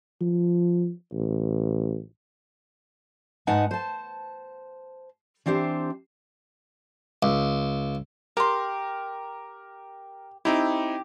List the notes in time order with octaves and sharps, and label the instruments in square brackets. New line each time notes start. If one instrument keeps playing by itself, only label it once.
[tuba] F3
A1
[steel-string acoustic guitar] G#2 D#4 B4 F#5 G#5 A5
C5 A5
E3 C4 D4 G4 C5
[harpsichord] C#2
[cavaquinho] G4 C6 [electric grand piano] A#4
[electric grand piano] C4 D#4 E4 [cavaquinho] G4